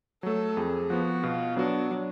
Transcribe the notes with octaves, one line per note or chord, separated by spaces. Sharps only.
F#3 A3 A4
F2 G#4
F3 B3 F#4
B2 F4
F#3 B3 D4 F#4
F#3